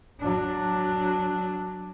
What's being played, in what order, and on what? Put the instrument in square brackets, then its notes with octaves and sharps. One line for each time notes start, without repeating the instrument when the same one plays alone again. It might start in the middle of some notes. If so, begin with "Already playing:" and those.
[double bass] F#3 D4